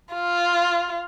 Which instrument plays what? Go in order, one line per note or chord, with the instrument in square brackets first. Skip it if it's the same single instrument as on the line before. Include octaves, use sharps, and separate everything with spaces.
[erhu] F4